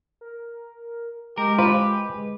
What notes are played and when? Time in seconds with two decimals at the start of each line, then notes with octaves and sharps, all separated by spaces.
0.21 A#4
1.38 G#3 G4 A#4
1.59 F4 B4 C5